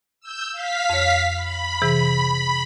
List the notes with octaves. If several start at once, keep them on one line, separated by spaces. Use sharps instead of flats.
E6 G6
F5 B6
F2 C#5
B5
C3 E3 G#4